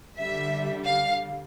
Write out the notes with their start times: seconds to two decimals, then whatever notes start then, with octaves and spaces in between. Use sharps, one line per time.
0.17 D3 G3 E5
0.87 F5